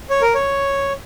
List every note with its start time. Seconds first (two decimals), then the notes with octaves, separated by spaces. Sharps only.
0.10 C#5
0.22 A#4
0.35 C#5